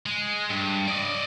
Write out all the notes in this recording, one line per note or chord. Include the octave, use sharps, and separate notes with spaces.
G#3
G2
D5 D#5